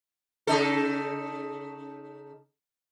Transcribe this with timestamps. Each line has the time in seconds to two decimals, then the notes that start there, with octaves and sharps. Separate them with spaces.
0.47 C#3 D#4 A4